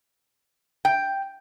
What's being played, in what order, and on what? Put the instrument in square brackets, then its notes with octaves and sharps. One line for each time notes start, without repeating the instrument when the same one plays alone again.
[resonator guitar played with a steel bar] G5